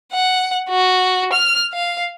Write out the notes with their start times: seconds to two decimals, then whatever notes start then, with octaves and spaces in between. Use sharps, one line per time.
0.12 F#5
0.69 F#4
1.33 F6
1.73 F5